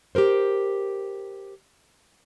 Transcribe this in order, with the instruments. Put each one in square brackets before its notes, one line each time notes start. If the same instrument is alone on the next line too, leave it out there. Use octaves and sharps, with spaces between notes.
[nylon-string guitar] G4 A4 A#4 C5